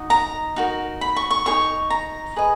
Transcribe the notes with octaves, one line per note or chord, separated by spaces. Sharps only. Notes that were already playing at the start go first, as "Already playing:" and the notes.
Already playing: D#4 F#4 D#5
A#5
D#4 F#4 A#4
B5
C#6
C#6
D#4 G#4 C#5 C#6
A#5
G#4 B4 D#5